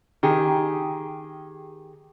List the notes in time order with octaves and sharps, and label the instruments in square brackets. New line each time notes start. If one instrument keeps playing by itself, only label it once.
[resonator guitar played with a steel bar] D#3 G4 G#4